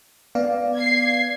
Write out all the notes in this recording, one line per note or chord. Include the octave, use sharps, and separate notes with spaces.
B3 D5 F5
G#6 C7